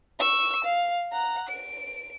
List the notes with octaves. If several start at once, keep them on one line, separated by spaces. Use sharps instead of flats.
C#6 E6
F5
F#5 A#5
D7